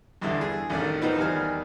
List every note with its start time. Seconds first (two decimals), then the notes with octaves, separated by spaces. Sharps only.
0.22 E2 G2 D3 E4
0.41 G#4
0.70 A1 D#3 D4 A4 D5
1.02 B3 D#4 F4 C5
1.18 E2 D#3 G3 G#5 F6